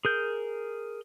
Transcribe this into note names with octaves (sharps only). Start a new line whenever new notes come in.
G#4 A#4 G6